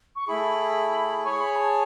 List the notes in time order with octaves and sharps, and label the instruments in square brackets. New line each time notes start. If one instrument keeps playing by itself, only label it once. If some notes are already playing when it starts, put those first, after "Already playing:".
[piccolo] C#6
[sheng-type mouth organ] A3 E4 G#4 [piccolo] B5
[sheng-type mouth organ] G#4 C#5 G#5 [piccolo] C#6
[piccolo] B5
A5